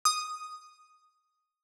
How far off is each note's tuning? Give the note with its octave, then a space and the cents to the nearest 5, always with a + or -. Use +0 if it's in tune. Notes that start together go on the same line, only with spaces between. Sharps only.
D#6 -5